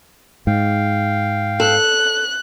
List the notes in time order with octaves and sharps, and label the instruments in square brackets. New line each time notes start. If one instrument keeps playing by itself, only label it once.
[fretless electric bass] G#2 [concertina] F5 G5
[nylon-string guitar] A4 [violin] F#6